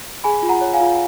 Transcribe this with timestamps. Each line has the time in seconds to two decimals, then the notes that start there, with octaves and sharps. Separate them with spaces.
0.24 G#4 G#5 B5
0.43 F4
0.49 F#5 A#5
0.61 C#5
0.74 F5 G#5
0.80 F4